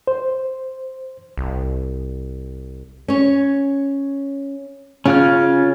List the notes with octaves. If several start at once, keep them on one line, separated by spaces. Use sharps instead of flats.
C5
C2
C#4 C#5
C#3 C#4 F4 F6